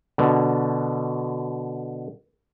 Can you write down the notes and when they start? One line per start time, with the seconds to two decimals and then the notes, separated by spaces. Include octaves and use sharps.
0.18 B2 D3